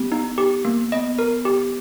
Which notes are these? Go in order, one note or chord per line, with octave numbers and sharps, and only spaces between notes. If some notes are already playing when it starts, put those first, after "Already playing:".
Already playing: B3 G4
D#4
G4
A#3
B3 D#5
A#4
G4